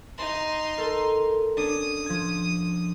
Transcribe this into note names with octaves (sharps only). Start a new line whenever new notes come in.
D#4 C6
A4 A#4
C#4 D4 D#6
F3 G#6